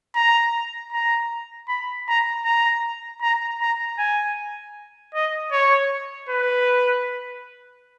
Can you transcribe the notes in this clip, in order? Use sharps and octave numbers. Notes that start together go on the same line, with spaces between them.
A#5
A#5
B5
A#5
A#5
A#5
A#5
G#5
D#5
C#5
B4